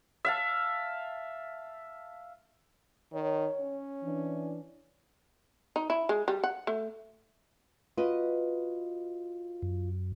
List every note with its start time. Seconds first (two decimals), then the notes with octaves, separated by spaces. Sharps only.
0.25 E5 F5 A5
3.12 D#3 C#5
3.60 C#4
4.04 E3 D4
5.76 D#4
5.90 E4
6.09 G#3
6.28 G3
6.44 F#5
6.67 A3
7.98 F4 F#4 B4 D#5
9.62 F#2